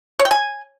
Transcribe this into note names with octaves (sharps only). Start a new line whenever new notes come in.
C#5
G5
G#5